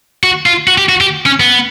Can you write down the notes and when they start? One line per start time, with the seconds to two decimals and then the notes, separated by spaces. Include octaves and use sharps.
0.23 F#4
0.46 F4
0.67 F#4
0.78 G4
0.89 F#4
1.01 G4
1.26 C#4
1.40 B3